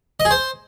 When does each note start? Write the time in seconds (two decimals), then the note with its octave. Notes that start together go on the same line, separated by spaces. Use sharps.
0.20 D#5
0.25 G#4
0.31 C5